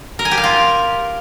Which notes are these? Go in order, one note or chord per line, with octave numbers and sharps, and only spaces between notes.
A#4
G#5
G4
F5
F4